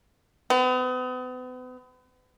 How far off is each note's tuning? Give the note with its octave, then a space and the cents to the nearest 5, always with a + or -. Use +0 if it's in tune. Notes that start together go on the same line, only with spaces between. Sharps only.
B3 +40